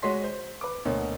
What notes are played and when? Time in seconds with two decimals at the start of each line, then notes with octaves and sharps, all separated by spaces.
0.02 G#3 F#4 C#5 D#5 C6 B6
0.24 C5
0.61 B4 D6
0.85 D2 B2 A#3 C#5